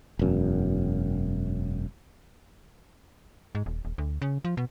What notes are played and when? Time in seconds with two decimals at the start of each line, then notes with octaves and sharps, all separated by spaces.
0.19 E1 F#2
3.55 G#2
3.66 D#1
3.85 D#1
3.98 D2
4.22 C#3
4.45 F3
4.57 B2